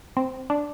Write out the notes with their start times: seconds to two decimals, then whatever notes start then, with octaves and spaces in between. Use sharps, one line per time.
0.17 C4
0.50 D4